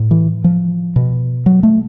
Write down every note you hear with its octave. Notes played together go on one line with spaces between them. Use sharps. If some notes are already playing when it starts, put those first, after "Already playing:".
Already playing: A2
E3
F3
B2
F#3
A3